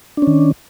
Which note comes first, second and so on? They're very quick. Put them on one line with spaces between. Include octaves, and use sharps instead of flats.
D4 C#4 D#3